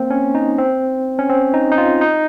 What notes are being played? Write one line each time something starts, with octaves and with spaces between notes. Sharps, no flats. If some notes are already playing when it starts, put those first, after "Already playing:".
Already playing: A#3 C4
C#4
D#4
C4
C#4
C4
D#4
D#4
F4
D#4